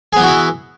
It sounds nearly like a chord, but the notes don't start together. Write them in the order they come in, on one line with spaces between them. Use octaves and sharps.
G#4 B3 E3 F#4 E4